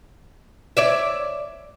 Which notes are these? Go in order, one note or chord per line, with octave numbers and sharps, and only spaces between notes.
C#5 D5 E5